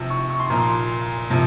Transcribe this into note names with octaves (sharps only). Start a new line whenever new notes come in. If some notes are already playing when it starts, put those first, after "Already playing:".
Already playing: C3 F3 E6
C#6
C#6
C6
A#2 F3 A#5
C6
C3 F3